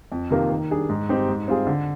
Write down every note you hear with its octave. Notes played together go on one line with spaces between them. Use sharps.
F2
C3 D#3 A#3 F4
D#3
G3 D4 G#4
G#2
G3 C4 D#4 G4
G#2
G3 C4 F4 G#4
D3